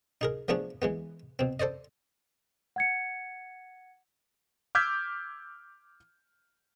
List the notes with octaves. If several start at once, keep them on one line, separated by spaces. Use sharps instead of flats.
D#4 G#4 A#4
F3 A3 B3 D4 G#4
E3 G#3 B3
B2 C4
A4 C5 D5 D#5
F#5 G#6 C#7
D6 E6 F6 G6 G#6 B6